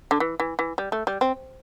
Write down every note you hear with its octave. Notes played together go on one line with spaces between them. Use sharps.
D3
E3
E3
E3
G3
A3
G3
C4